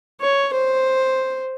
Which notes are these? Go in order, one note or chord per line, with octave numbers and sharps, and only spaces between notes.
C#5
C5